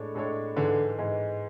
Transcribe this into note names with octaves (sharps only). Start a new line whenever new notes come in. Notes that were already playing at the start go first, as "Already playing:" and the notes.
Already playing: A2 G#3 D4 A4 C#5
A2 G#3 D4 A4 C#5
G#2 D3 E3 G#3
G#2 E3 G#3